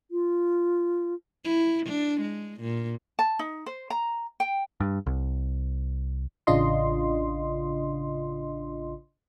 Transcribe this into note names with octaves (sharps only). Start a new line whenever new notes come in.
F4
E4
D4
G#3
A#2
A5
D#4
C5
A#5
G5
G2
C2
A1 C#3 D4 F4 D#5 C6